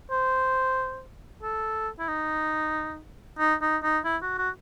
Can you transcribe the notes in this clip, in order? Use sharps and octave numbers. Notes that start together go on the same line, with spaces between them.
C5
A4
E4
D#4
D#4
D#4
D#4
E4
F#4
F#4